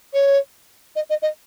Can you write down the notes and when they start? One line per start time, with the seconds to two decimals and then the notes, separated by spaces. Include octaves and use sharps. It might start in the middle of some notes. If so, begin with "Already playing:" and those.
0.13 C#5
0.96 D#5
1.09 D#5
1.22 D#5